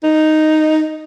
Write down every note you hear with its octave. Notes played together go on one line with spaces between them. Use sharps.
D#4